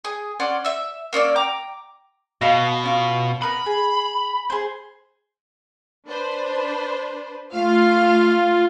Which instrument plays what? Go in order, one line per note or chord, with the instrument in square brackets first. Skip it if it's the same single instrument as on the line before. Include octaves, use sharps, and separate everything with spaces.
[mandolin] G#4
C#4 D5 F#5 C6
E5 E6
A#3 C#4 D5 E6
G5 A#5 D6
[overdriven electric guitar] B2 [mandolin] D#5 F5 A5
[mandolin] C#4 F4 C#6
[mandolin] B3 A#4 B4 [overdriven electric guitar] B5
[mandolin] G#4
G#4 C5
[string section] D4 B4 C5
[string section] A3 F5 F6 [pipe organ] F4